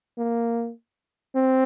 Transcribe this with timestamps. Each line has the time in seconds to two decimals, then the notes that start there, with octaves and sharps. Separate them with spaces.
0.18 A#3
1.35 C4